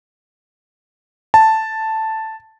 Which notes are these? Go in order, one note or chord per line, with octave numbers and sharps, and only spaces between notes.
A5